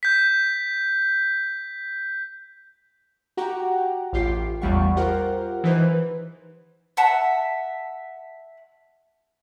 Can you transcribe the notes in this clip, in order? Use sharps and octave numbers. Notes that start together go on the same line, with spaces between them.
G6 B6
F#4 G4 F#5 G5 A#5
A1 F4 G4 C7
A1 E2 G3 F5 F#5 C#6
F4 G4 A#4 C5 F#5
E3 D#4 B4 C5
E5 F#5 A5